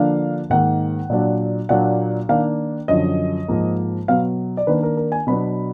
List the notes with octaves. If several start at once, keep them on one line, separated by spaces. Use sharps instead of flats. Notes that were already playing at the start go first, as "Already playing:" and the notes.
Already playing: D3 F3 A#3 D4 F5
G#2 D#3 A#3 D#4 F#5
A#2 F#3 D4
A#2 F#3 A#3 D4 F#5
D#3 A#3 D4 F5
F#2 D3 F3 D#5
G#2 F3 A#3
B2 F#3 B3 F5
D5
D#3 A#3 D4 B4
A#4
A#4
G#5
B2 F#3 B3 D4 B5